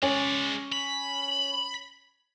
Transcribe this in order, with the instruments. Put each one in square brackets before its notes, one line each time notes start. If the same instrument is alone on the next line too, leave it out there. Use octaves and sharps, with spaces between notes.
[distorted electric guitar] G#3 D5 [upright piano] C#4
[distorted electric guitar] B5